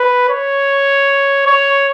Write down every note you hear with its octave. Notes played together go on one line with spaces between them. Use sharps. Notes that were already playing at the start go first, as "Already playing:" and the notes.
Already playing: B4
C#5
C#5